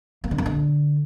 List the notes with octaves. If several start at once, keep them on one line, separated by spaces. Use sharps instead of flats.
A#3
D3
A#3
D3